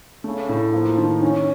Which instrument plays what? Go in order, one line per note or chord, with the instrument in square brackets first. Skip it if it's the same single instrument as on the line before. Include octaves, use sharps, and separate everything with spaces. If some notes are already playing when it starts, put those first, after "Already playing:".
[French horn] C#3 [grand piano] A3
[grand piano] A2
[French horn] F3 [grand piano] A#3
[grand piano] D#3
[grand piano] D#3 [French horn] C#4